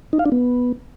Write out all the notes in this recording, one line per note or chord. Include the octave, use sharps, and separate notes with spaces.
D#4
F5
D4
B3